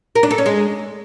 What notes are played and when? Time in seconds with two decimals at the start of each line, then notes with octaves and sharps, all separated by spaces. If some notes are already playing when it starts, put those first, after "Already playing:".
0.15 A#4
0.23 D4
0.31 A4
0.38 C#4
0.46 G#3